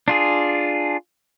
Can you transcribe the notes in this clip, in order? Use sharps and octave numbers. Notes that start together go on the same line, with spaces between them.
D4 F4 G#4